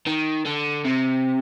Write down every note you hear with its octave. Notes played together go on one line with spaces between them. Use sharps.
D#3
D3
C3